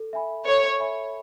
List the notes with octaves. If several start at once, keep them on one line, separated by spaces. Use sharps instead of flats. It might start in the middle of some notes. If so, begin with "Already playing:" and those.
Already playing: A4
E5 G#5 B5
A4 C#5
E5 G#5 B5